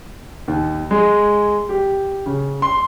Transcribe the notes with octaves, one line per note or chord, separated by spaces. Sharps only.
D#2
G#3
G4
C#3
C6